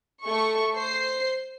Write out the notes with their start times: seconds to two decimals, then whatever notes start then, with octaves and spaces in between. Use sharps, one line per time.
0.24 A3 A4 C#6
0.76 C5 C7